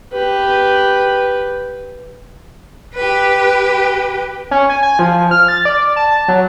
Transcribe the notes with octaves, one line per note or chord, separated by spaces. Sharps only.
G4 B4
G4 B4
C#4
G#5
G#5
F3
F6
A6
D5
A5
F#3